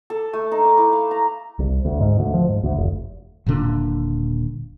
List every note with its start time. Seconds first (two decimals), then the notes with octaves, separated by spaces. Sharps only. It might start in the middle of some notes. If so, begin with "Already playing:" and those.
0.10 A4
0.33 A3
0.52 D#4
0.65 D6
0.77 E4
0.92 F5
1.11 A#5
1.59 C2
1.85 D2
2.01 G#2
2.19 D2
2.34 F3
2.49 G#2
2.63 D2
2.77 F1
3.46 D#1 A#2 D3 D4